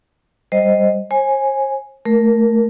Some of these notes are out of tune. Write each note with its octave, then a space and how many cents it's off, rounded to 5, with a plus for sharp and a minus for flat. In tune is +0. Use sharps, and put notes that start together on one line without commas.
G3 +0 C5 +0 D#5 +0
C5 +45 G#5 +0
A3 +0 A#4 +5